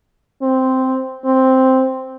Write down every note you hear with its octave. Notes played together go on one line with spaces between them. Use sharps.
C4
C4